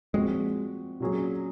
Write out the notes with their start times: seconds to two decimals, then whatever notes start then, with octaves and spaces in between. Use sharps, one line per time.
0.14 A#2 F3 G#3 C4 F#4
1.00 A#2 F#3 C#4 G#4